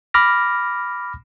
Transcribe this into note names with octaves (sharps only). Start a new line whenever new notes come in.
B5 D6 F6 A#6